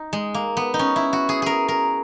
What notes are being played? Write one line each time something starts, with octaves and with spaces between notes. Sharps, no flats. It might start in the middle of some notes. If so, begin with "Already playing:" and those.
Already playing: D#4
G#3
A#3
B3
D#4
C#4
E4
F#4
G#4
G#4 A#4
A#4